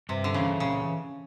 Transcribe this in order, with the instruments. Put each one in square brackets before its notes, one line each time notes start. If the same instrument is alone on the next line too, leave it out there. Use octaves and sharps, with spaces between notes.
[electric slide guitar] G2 [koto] C3
[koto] D3
[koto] C#3 [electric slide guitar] E3
[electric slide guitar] A#2 [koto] C#3